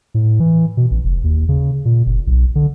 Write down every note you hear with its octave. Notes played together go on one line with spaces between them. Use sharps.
A2
E3
B2
A1
F1
D#2
C#3
A#2
F#1
B1
D3